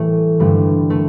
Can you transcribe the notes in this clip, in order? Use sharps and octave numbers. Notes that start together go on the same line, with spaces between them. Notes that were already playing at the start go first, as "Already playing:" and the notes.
Already playing: A2 E3 G3 A3
G2 D3 G3 A3
A3